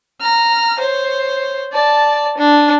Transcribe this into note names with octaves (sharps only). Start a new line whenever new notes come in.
A#5 F6
C5 C#5
D5 A5
D4